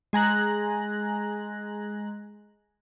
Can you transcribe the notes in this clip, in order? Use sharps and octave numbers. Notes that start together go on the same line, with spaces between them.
G#3 G#5 A#5 F#6